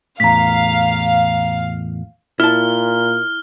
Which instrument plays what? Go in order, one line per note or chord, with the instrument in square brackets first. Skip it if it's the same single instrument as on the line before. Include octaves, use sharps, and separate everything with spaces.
[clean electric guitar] E2 A2 [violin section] F5 [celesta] A#5 B6
[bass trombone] A#2 [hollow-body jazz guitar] E4 A5 [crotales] F6